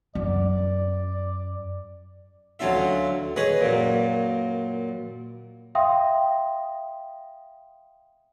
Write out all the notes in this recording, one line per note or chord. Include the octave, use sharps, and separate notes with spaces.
F#2 D5
D2 F#3 C#4 F4 E5
G#4 B4 C#5 D#5
F#2 A#2
E5 F5 G5 C6 D#6